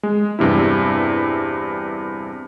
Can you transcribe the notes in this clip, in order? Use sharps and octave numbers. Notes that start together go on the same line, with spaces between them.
G#3
E2 G2 C3 E4